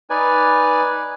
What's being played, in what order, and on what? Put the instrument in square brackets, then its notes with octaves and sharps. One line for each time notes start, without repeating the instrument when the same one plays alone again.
[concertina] D#4 B4 D5 G#5